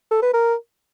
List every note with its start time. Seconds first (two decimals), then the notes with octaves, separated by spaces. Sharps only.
0.11 A4
0.22 B4
0.34 A#4